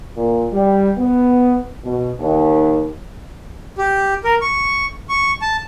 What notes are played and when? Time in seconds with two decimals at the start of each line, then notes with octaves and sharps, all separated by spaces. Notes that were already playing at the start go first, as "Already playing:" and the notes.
0.16 A#2
0.52 G3
0.97 B3
1.84 B2
2.20 D#2
3.78 G4
4.24 A#4
4.41 C#6
5.09 C#6
5.42 A5